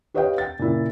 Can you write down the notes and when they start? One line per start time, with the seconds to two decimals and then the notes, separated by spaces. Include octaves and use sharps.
0.14 G4 B4 C#5 D#5 F5 G5
0.38 G5 A6
0.59 A#2 C#3 E4